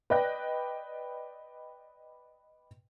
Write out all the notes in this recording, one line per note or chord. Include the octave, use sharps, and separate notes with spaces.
B4 D5 D#5 G5 F#6 A#6